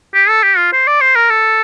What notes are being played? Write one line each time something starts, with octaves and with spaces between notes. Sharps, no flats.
G4
A4
G4
F4
C5
D5
C5
A#4
A4